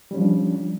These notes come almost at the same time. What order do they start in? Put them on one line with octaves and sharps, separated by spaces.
G3 C#4 F3 D4